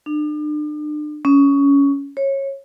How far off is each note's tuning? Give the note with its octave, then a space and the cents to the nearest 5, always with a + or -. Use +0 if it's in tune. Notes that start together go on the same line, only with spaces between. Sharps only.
D4 +40
C#4 +15
C#5 -20